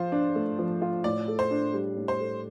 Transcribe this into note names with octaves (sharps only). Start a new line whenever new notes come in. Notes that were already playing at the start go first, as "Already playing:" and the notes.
Already playing: F3 F4 C5
D4
A3
F3
F4
A2 D5
A4
C5
D4
G3
A2
C5
A4